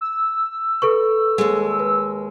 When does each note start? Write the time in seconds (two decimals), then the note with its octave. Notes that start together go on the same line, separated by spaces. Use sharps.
0.01 E6
0.82 A4 B4 C#6
1.38 D#2 G#3
1.79 B4